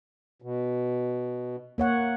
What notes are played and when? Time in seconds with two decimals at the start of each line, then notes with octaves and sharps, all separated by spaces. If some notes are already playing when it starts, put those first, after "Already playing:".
0.42 B2
1.78 A#3 C#5 F#5